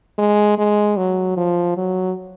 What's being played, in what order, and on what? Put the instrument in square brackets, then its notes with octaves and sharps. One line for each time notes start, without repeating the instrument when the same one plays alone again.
[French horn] G#3
G#3
F#3
F3
F#3